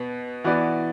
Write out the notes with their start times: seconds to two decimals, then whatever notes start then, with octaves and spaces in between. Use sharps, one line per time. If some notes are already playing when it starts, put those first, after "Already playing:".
Already playing: B2 B3
0.44 E3 B3 F#4 B4 D5